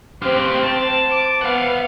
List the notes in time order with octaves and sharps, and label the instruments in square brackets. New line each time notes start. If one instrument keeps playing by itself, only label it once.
[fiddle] C4 [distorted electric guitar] G4 F5
[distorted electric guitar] A5
[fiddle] D6
[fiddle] B3 [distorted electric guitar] F5 F#5